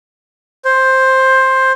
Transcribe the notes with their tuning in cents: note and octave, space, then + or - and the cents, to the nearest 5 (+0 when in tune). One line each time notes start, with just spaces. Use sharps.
C5 +10